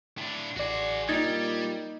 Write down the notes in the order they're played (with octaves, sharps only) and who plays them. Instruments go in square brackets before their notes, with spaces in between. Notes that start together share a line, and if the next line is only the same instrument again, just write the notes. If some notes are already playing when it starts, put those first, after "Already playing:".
[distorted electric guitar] A2 D4
[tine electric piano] A1 D5 [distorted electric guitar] F#4 G#4
[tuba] A#2 [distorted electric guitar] G3 [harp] D#4 [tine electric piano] G#6 A6